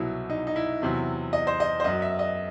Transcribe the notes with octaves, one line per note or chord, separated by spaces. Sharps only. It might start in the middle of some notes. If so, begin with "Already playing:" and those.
Already playing: C2 B2 F#3 E4
D#4
D#4
E4
E2 C3 F#3
D#5
C5
D#5
C5
F#2 F#3 D#5
E5
D#5